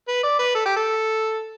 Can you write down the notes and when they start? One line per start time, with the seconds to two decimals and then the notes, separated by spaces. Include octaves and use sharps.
0.08 B4
0.23 D5
0.39 B4
0.55 A4
0.66 G4
0.76 A4